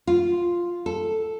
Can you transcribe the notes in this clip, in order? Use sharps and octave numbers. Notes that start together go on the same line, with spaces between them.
F4
A4